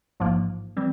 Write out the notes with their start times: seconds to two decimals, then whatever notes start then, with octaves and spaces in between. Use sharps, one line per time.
0.20 A1 G#2 F3 A#3
0.77 E3 G3 C4